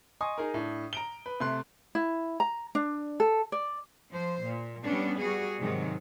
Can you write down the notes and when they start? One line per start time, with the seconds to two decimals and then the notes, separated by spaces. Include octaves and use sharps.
0.21 D#5 G#5 C6 C#6 D#6
0.38 D#4 G#4 A#4
0.54 A2 D4
0.93 A#5 D7 G7
1.26 B4
1.40 C3 A3 C6 F#6
1.95 E4
2.40 A#5
2.75 D4
3.20 A4
3.52 D5
4.11 F3 C5
4.45 A#2
4.84 G3 B3 C#4 D4
5.20 G3 F#4 G#4
5.59 G#2 C3 D#3 F#3 G#3